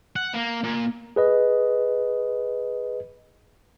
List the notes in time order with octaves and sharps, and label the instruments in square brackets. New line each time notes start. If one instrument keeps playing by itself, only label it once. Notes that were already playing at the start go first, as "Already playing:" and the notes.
[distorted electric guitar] F#5
A#3
A#2
[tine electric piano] G#4 B4 D#5